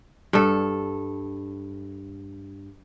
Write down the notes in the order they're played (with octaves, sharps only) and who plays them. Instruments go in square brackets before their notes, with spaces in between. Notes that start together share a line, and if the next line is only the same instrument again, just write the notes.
[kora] G2 A4